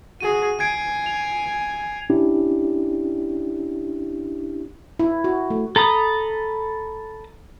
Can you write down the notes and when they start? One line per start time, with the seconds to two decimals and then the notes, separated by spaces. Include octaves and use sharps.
0.20 F#4 G#4 D#7
0.60 G#5 G#6 C7 D7
1.06 F7
2.10 C#4 D4 E4 G4
5.00 E4
5.24 F#4
5.50 A3
5.76 A4 A#5 B5 D#6